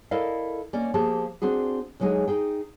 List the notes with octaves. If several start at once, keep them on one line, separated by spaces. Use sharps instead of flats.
E4 A4 A#4 D5 D#5 F5
A#3 C#4 D5 D#5
F3 A#3 G4 G#4 A5
C4 D4 F#4 G#4
D2 F#3 G#3 D#4 G#4
D#4 G#4 G5